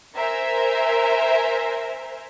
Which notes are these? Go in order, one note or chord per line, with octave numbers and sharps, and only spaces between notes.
A#4 C5 E5 G#5